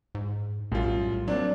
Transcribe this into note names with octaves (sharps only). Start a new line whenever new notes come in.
G#2
A#1 F#2 A2 G3 F4
F#3 A#3 C4 D4 D5